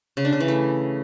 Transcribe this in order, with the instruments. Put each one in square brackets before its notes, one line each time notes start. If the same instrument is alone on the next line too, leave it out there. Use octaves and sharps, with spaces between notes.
[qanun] C#3
D4
C#3
E3
A3